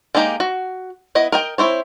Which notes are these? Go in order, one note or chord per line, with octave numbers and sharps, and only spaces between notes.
G#3 A#3 D#4 G4 A#5
F#4
B3 E4 D#5
A#4 D#5 G5
C4 E4 C5 C#5